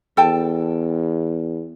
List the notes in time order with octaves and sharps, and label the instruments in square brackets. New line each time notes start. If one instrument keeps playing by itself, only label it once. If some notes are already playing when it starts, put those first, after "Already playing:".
[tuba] E2 [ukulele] A4 G5 A5